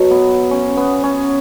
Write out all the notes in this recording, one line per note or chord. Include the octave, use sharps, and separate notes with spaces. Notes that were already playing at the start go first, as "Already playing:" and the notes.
Already playing: B2 F#3
B3
C#4
B3
C#4